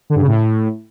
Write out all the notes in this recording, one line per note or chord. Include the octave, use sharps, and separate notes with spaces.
D3
G2
C#3
A2